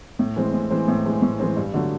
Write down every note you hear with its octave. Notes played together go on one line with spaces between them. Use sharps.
A2
E3 G#3 C4
A2
E3 G#3 C4
A2
E3 G#3 C4
A2
E3 G#3 C4
G2
D3 F#3 A3